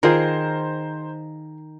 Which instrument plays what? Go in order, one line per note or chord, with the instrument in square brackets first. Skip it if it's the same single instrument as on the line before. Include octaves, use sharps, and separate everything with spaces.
[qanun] D#3 [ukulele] F4 G#4 A#4 [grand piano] C5 A#5